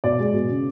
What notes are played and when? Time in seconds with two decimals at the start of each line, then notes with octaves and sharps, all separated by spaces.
0.04 B2 D5
0.20 G#3
0.34 B2
0.49 C#3